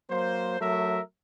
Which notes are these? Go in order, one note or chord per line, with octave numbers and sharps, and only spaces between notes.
F#3 A#3 C5
F#3 A3 A#4 E5